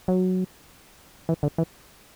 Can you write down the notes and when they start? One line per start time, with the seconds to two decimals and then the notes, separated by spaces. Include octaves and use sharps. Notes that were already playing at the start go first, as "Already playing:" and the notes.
0.08 F#3
1.29 E3
1.43 D3
1.58 E3